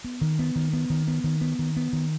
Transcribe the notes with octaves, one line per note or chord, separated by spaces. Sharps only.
B3
D#3
B3
D#3
B3
D#3
B3
D#3
B3
D#3
B3
D#3